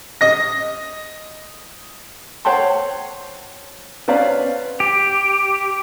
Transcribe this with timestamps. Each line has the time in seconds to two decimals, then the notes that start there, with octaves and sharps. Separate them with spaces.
0.21 D#5 A#6
2.45 C5 C#5 F#5 G5 A5 C6
4.08 B3 C#4 C5 D5 F5
4.80 G4